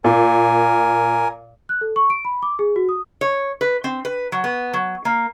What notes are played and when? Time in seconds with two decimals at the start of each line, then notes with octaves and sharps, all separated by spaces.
0.04 A#2 A#4 G#5
1.69 F#6
1.81 A4
1.96 C#6
2.10 D7
2.25 B5
2.43 D6
2.59 G#4
2.76 F#4
2.89 D#6
3.21 C#5
3.61 B4
3.84 C4
4.05 B4
4.32 F#3
4.44 B3
4.74 F#3
5.05 A#3